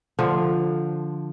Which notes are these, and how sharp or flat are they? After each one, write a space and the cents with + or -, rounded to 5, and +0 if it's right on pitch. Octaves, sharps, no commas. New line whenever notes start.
D3 +0 F3 +0